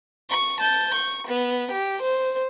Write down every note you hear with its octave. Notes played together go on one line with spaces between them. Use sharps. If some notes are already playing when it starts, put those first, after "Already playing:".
C#6
A5 G6
C#6
B3
G4
C5